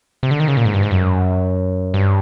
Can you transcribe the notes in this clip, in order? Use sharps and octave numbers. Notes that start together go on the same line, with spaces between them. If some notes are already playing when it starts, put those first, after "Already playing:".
C3
D3
D#3
C#3
A#2
G#2
G2
G#2
F#2
G2